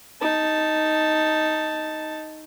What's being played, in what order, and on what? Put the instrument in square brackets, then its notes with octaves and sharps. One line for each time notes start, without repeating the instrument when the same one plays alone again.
[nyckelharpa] D#4 A5